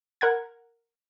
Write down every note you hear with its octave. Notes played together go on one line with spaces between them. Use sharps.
A#4 F#5 G#6